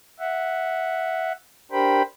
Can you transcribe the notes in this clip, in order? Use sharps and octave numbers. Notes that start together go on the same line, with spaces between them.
E5 F#5
D4 G4 A#4 C5 G5 B5